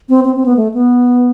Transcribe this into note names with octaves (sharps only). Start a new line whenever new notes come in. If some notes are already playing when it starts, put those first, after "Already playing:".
C4
C4
C4
B3
A3
B3